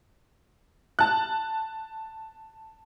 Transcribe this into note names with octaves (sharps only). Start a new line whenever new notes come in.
A5 F#6